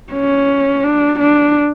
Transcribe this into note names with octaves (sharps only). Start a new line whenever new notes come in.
C#4
D4
D4